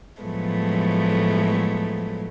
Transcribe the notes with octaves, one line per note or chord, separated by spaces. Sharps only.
A2 F3 F#3 G#3 A3 B3